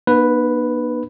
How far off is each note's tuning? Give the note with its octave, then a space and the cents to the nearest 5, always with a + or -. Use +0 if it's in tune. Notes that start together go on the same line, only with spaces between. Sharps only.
A#3 +45 D#4 -45 B4 +0